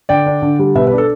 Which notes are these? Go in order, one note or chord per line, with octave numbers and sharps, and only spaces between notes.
D3 D5 G5
D4
D3
G3
B2 B4 E5
B4
D4
A4